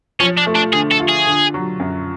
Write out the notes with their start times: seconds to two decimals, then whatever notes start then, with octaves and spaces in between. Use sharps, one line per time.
0.20 F3 C#4
0.38 D4
0.47 A3
0.55 D4
0.73 D3 G#4
0.91 A4
1.00 F4
1.09 G#4
1.27 D3
1.54 F#3
1.80 F#2